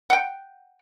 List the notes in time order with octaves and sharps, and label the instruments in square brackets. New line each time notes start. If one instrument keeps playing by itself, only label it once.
[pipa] F#5 G5